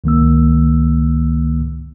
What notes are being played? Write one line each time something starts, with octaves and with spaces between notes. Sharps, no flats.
C#2 D#3 A#3 E6